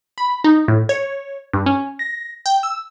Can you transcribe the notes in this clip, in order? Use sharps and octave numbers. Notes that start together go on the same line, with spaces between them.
B5
D#4
A2
C#5
G2
C#4
A#6
G5
E6